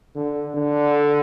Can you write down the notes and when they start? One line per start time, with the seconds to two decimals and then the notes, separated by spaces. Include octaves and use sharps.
0.15 D3
0.55 D3